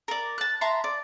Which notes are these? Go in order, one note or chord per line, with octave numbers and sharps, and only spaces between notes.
A#4 D5
A5 F#6
E5 A5 A#5 C6
D5